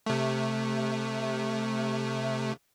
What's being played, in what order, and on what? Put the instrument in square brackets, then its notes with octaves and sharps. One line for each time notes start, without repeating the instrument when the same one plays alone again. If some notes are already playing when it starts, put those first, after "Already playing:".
[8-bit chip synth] C3 A3